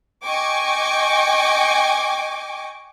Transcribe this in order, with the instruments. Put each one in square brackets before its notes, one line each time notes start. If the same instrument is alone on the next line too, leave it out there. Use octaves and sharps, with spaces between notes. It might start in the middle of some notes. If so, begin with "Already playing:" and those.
[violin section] D#5 G5 G#5 C#6 D6